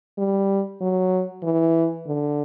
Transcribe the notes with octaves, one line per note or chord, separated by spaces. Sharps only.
G3
F#3
E3
D3